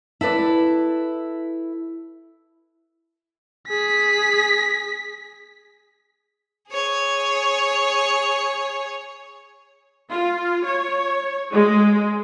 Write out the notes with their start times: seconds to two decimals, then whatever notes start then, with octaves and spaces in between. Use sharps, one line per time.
0.21 E4 A4 B4 D5
3.68 G#4 B6
6.70 G#4 C#5
10.11 F4
10.65 C#5
11.52 G#3